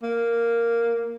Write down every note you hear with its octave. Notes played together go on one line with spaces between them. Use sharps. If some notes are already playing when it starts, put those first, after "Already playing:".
A#3